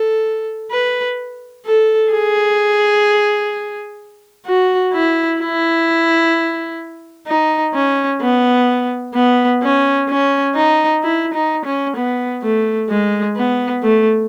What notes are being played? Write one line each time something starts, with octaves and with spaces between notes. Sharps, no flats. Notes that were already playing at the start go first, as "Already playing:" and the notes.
Already playing: A4
B4
A4
G#4
F#4
E4
E4
D#4
C#4
B3
B3
C#4
C#4
D#4
E4
D#4
C#4
B3
A3
G#3
B3
A3